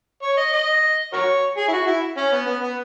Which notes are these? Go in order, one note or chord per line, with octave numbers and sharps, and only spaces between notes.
C#5
D#5
D#5
F#4 A#4 C#5
G#4
E4
F#4
E4
C#4
B3
B3
B3